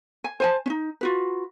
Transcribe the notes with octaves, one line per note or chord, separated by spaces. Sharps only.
G#5
C5 G#5 A5
C#4 D#4
F4 F#4 B4